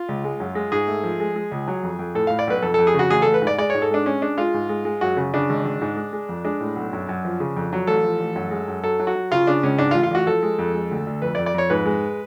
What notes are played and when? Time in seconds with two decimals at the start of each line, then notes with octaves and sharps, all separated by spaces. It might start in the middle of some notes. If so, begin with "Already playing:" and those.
Already playing: F4
0.09 C#2
0.24 G#3
0.40 F#2
0.55 G#3
0.72 G#2 G#4
0.88 A3
1.04 F3
1.20 G#3
1.36 G#3
1.52 C#2
1.67 F#3
1.83 F2
1.99 F2
2.15 A2 A4
2.27 A2 F5
2.39 D5
2.47 B1 B4
2.62 F2 A4
2.74 F2 A4
2.87 G#4
2.94 C#3 F#4
3.10 A1 G#4
3.22 A1 A4
3.34 B4
3.42 G#2
3.47 D5
3.58 G#3 D5
3.70 G#2 C#5
3.82 A4
3.91 G#3 D4
4.06 G#3 C#4
4.22 G#3 D4
4.38 G#3 F4
4.54 G#2
4.69 G#3
4.85 G#3
5.01 F#2 F#4
5.17 C#3
5.34 C#3 D4
5.50 G#1
5.65 G#1
5.82 G#2
5.97 G#3
6.13 G#3
6.29 F2
6.44 G#3 D4
6.60 A2
6.76 B1
6.93 F#2
7.09 F#2
7.25 F3
7.40 C#3
7.57 F2
7.73 F#3
7.87 A1 A4
8.04 F3
8.20 A1
8.36 F#2
8.51 G#3
8.68 F#2
8.83 F#3 A4
8.99 F#3
9.07 F#4
9.15 F#3
9.31 C#3 F4
9.47 C#3 D4
9.63 C#2 C#4
9.79 G#2 D4
9.91 F4
9.95 A1
10.03 F4
10.11 A1 F#4
10.27 F3 A4
10.43 G#3
10.59 F2
10.75 G#3
10.91 D2
11.07 D2
11.22 F2 B4
11.35 D5
11.38 F2
11.46 D5
11.54 F2 C#5
11.70 G#2 B4
11.86 G#3